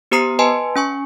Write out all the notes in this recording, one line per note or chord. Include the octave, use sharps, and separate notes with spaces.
B3 G4 C5 A#5 D#6 C7
B4 D#5 G#5 A5 C6
C#4 G#5 C#6